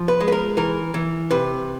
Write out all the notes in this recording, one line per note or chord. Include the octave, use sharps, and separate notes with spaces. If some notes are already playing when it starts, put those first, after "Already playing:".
Already playing: F3
B4
G#3
B4
A#4
E3 A#4
E3
C3 B4